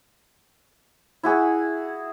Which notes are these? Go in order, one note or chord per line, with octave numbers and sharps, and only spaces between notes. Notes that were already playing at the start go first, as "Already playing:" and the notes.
E4 F#4 G#4